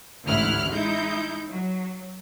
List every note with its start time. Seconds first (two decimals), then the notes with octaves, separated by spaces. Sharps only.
0.25 A1 D2 G#2 E4 F6 F#6
0.71 G#3 D#4 E4 G6
1.50 F#3